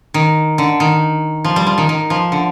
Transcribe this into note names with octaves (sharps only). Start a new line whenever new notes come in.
D#3
D3
D#3
F3
G3
F3
D#3
D#3
F3
D3